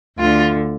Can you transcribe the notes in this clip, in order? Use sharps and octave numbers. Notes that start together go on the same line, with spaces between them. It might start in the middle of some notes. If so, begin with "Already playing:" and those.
D2 D3 F4